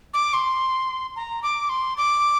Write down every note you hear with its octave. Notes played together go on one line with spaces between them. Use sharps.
D6
C6
A#5
D6
C6
D6